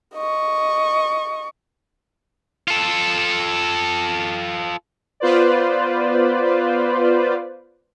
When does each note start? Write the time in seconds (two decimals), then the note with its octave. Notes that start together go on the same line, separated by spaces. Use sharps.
0.14 D#5 C#6
2.68 F4 A4
5.20 B3 F4 B4 C5 D5